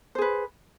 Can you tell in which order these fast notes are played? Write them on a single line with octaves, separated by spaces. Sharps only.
C5 G#4 B4